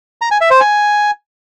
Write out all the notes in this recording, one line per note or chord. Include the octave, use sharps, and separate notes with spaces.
A#5
G#5
E5
C5
G#5